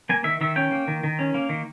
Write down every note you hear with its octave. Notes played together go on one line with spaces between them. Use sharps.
A#3 G#5
D#3 E5
D#3 E5
C#4 G5
A#3
D#3
D#3
C#4
A#3
D#3